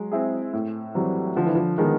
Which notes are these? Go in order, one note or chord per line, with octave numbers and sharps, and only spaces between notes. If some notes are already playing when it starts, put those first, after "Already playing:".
Already playing: F#3 G#3
C4 E4 G#4
A2
E3 F#3 G3 C4
D3 F3
E3
F3
D#3 F3 G#3 B3